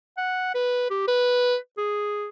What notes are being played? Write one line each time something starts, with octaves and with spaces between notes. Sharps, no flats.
F#5
B4
G4
B4
G#4